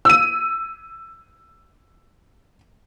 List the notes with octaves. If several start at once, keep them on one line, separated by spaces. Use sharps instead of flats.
E6 D#7